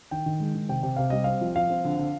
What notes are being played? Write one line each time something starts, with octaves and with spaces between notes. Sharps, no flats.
D#3 G5
D#3
G#3
D#3
C3 G5
C3 G5
C3 F5
G3 D#5
C4 F5
F3
F3 F5
C4
D3
D3